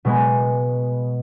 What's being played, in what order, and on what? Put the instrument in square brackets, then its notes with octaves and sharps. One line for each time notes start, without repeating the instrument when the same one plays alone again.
[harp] B2 G#3 B3